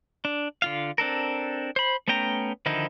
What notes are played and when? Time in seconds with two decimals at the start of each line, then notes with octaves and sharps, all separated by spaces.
0.25 D4
0.62 D3 F4 F5
0.98 C4 D4 A4 A#4
1.76 C5 B5
2.08 A3 B3 C#4 G5 A#5
2.66 D3 D#3 F3 D#4 E4